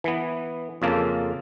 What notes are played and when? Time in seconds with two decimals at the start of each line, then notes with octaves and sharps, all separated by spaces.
0.04 E3 B3
0.82 F2 C#3 A#3 F4 A4